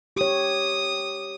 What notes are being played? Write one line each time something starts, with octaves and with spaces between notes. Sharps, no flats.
G4 C#5 D#6